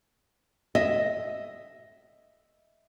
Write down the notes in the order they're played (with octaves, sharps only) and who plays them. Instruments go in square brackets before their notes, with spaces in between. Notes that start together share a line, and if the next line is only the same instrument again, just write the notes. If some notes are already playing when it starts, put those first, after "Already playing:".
[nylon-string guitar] D#5 [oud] E5